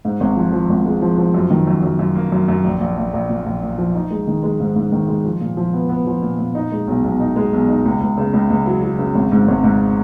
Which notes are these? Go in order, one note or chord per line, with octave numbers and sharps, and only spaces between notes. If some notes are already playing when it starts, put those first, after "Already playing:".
G#2
G#1
F3
F3
G#1
G#3
F3
F3
F#2
D#3
F#2
F#2
F#2
A#3
F#2
F#2
A#1
A#1
A#1
A#1
A#2
A#1
A#2
F3
D#4
G#3
D#3
G#3
G#2
G#2
D#3
G#3
F3
A#2
F3
B3
B3
F3
A#2
A#2
D#4
G#3
B1
B1
D#4
G#3
B1
D#4
C#2
C#2
C#3
C#2
C#2
F#3
F#3
C#3
G#1
G#2
G#1
G#2